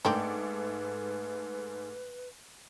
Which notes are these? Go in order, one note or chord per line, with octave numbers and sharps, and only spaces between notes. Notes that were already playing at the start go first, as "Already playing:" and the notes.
G#2 A3 A#3 C4 D4 B4 D6